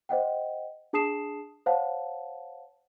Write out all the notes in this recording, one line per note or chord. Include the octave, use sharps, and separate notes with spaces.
C5 D#5 F#5 G5
D4 G#4 A5 D#6 C7 E7
C5 C#5 F5 F#5 A5